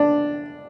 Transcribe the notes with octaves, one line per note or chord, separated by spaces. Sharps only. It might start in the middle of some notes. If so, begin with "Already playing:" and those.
Already playing: D4